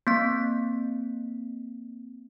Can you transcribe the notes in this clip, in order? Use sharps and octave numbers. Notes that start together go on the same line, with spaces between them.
A#3 C4 B6